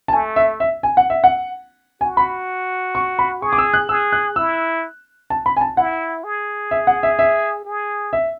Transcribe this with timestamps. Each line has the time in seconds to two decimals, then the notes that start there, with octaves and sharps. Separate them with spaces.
0.08 A5
0.13 A3 G#5
0.36 E5
0.60 E5
0.83 G#5
0.97 F#5
1.10 E5
1.24 F#5
2.01 F#4 G#5
2.17 B5
2.95 C#6
3.19 B5
3.42 G#4 C#6
3.53 D6
3.58 E6
3.74 F#6
3.89 G#4 E6
4.12 F#6
4.36 E4 E6
5.30 A5
5.46 B5
5.56 G#5
5.61 A5
5.77 E4 F#5
6.24 G#4
6.71 E5
6.87 F#5
7.03 E5
7.19 E5
7.65 G#4
8.13 E5